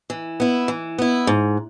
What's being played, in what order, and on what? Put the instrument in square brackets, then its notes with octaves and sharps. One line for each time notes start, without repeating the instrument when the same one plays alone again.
[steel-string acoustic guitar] E3
B3 E4
E3
B3 E4
G#2